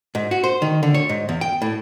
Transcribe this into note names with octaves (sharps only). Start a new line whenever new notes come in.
G#2
F#4
C5
D#3
D3
C#5
G#2
E2
G5
A2